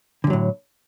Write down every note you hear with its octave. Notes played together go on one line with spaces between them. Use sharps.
F#2 A2 D3 F#3